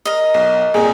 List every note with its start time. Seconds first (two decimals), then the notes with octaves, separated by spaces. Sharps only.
0.05 A#4 D#5
0.34 B1
0.74 C2 A#2 G#4